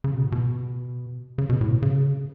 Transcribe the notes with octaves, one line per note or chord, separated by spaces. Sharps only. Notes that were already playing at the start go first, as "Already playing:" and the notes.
C#3
B2
A2
B2
C#3
B2
A2
B2
C#3